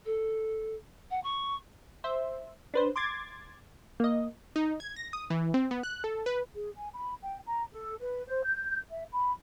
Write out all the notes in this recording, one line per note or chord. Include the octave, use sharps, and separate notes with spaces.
A4
F#5
C#6
C5 E5
D4 B4 C5
C6 D6 G#6 A6
A#3 D#5
D#4
G#6
A#6
D#6
E3
C4
B3
F#6
A4
B4
G#4
G#5
B5
G5
A#5
A4
B4
C5
G6
E5
B5